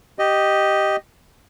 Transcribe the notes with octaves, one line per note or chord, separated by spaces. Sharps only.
G4 D#5